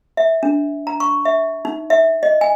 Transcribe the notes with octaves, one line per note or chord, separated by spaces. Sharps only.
E5
D4
A#5
C#6
E5
D#4
E5
D#5
G#5